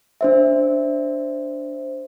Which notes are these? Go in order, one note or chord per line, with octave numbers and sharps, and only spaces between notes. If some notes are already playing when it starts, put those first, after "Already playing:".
D4 C5 E5